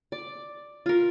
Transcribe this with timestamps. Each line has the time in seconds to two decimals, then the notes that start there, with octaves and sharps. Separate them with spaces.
0.12 D5
0.86 F4 A#4